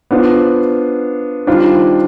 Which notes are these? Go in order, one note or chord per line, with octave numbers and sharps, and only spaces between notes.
B3 D4 F4 C5
D#3 G3 D4 F4 C5